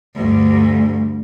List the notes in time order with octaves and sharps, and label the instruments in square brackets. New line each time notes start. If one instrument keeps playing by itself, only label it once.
[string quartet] D2 G2